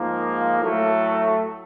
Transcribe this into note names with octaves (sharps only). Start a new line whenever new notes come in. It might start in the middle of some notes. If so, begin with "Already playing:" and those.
Already playing: G#2 F3 A#3
A2 F#3 A3